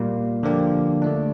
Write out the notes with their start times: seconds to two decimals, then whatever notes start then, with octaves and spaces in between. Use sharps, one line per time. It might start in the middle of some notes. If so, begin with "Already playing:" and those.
Already playing: A#2 G3 A#3 F4
0.43 D3 F3 A#3 D4 G4
1.02 D3 A3 D4